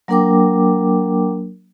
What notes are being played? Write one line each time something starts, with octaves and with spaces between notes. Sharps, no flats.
F#3 A#3 D4 A#4 G5 D6